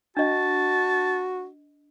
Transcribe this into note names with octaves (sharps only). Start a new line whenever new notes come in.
D4 F#4 D#5 A5